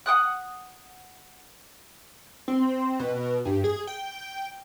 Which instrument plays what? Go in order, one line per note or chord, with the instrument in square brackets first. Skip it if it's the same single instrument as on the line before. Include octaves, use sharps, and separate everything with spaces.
[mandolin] F#5 G5 D#6 F#6
[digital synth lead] C4
B2
G2
G#4
G5